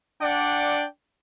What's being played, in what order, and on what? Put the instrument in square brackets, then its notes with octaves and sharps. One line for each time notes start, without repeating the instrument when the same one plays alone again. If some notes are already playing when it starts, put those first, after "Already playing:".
[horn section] D4 D5 F#5 G5